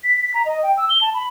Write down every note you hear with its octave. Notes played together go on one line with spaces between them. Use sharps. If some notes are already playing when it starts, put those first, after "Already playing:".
B6
B6
A#5
D#5
G5
E6
G7
A5
B5